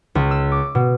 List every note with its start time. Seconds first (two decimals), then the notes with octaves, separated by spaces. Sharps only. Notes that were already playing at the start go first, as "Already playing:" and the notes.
0.15 C#2
0.31 E6
0.52 D6
0.75 B2